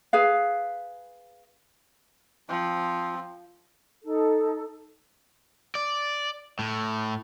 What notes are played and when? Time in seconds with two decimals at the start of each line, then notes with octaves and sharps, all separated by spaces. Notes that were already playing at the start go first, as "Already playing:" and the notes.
0.13 G#4 B4 F5
2.49 F3 C4
4.03 D#4 A4
5.75 D5
6.59 A2